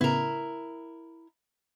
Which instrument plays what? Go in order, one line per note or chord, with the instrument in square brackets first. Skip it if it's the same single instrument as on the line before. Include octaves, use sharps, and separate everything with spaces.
[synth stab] A2 C#3 B3 [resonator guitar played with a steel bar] E4 A#4